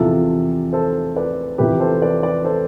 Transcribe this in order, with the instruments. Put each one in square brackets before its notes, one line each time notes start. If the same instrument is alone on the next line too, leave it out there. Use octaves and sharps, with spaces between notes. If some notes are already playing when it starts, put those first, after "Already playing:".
Already playing: [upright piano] E2 C3 F3 F4 A4
A4 C5
B4 D5
E2 C3 F3 G4 B4
A4 C5
B4 D5
B4 D5
A4 C5